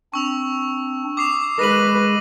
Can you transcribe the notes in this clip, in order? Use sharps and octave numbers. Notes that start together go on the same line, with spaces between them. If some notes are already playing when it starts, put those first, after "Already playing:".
C4 D4 C#6 E6 F7
D6 D#6 C7 F7
G#3 G#4 B4 A#6 D#7 F#7